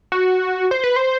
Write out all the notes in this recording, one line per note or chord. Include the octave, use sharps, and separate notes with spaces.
F#4
C5
B4
C5